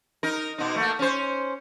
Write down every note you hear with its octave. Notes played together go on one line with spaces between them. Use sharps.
D#4 A#4
B2 D#4
A3 A#3
C#4 C5